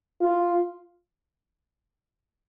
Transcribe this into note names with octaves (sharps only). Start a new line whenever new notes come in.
F4